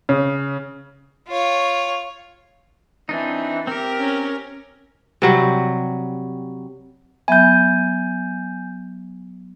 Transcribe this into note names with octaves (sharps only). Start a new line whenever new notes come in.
C#3
F4 C#5
E3 C4 D4 D#4
C4 G4 A#4
C#4
C3 F#3 G3
F#3 B3 E5 G#5 G6